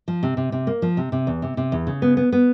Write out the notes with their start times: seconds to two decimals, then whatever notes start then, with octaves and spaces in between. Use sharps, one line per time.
0.08 F3
0.23 C3
0.37 C3
0.52 C3
0.67 A#3
0.82 F3
0.97 C3
1.12 C3
1.27 E2
1.42 C3
1.57 C3
1.72 E2
1.87 C#3
2.02 B3
2.17 B3
2.33 B3